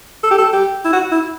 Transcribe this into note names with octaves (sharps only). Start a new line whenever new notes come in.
A4
G4
A4
G4
E4
F#4
E4